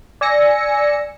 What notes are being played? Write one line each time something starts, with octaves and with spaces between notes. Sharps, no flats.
D5 G#5 E6 A#6 C#7